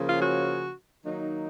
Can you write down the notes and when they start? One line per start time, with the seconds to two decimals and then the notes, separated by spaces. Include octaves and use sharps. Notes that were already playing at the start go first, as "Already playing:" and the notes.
Already playing: C#3 F3 A#3 C#4
0.09 F4
0.21 F#4
1.06 D#3 F#3 A#3 D#4